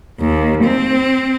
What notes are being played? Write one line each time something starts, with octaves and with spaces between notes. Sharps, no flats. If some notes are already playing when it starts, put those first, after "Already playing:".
D#2
C4